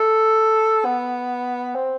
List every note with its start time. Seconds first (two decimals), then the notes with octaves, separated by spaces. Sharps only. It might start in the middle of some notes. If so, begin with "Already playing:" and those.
Already playing: A4
0.85 B3
1.75 C4